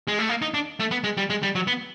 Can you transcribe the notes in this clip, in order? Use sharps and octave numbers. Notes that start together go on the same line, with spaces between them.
G#3
A3
A#3
D#4
D4
A3
B3
G#3
G3
G#3
G3
F#3
B3